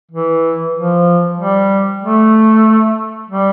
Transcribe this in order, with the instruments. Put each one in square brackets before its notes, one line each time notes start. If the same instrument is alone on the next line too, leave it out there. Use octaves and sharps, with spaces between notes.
[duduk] E3
F3
G3
A3
G3